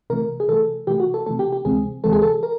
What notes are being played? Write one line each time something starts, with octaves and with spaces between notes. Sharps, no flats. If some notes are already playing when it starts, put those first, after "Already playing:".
C3 E3 A3 A#4
G#4
C3 E3 A3 A4
C3 E3 A3 G4
F#4
A4
C3 E3 A3 A4
G4
G4
D2 C3 E3 G#3 C4 G#4
D2 C3 E3 G#3 C4 A4
G#4
A4
A#4